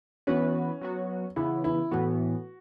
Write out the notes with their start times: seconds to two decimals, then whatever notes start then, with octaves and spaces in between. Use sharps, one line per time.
0.27 E3 B3 C#4 F#4 B4
0.81 F#3 B3 F#4
1.36 C#3 E3 B3 E4
1.64 E4
1.91 A2 E3 B3 F#4